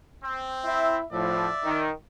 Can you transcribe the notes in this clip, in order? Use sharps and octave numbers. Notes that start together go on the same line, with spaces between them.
C4
E4 E5
A2 F3 D5 E5
D#3